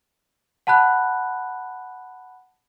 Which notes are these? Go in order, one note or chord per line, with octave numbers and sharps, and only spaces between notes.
F#5 A5 B5 F#6